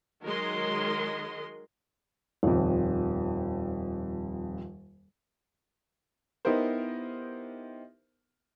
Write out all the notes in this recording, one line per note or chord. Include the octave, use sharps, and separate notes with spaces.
D#3 F#3 G#3 A#4 D#5 C6
D#1 F2
B3 D#4 E4 G4 A#4 C5